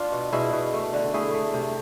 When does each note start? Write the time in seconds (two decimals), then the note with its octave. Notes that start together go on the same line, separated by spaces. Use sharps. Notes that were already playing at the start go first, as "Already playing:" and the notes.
Already playing: D4 F4
0.12 B2
0.32 B2 E4 G#4
0.53 B2
0.73 A3
0.93 D3
1.13 A3 E4 G#4
1.34 A3
1.54 C3